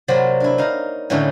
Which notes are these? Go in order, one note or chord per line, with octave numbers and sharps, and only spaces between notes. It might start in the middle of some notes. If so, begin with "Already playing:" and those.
C3 F#3 A#3 C5 D5 B5
D4 E4
D#4 F5 A#5
A2 D3 E3 A3 C#4 D#4